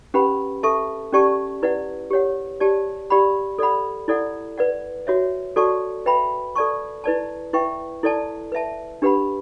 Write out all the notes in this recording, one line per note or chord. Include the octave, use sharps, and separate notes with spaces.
C#4 G4 B4 F#5 B5
A4 E5 A5 C#6
C#4 G4 D5 A5 C#6
E4 B4 D5 F#5
G4 C#5 F#5
G4 D5 A5
G4 D5 F#5 B5
A4 D5 F#5 B5
E4 A4 D5 F#5
B4 D5 F#5
F#4 C#5 E5
F#4 A4 D5 A5 C#6
B4 E5 G5 B5
A4 D5 A5 C#6
E4 B4 D5 A5
E4 B4 E5 G5 C#6
E4 A4 D5 A5
B4 E5 A5
D4 G4 B4 F#5 B5